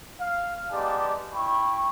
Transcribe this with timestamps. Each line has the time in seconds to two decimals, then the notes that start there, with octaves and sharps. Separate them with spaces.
0.21 F5
0.71 G#3 B3 D#4 G4 D5 A5
1.34 E4 G5 B5 C#6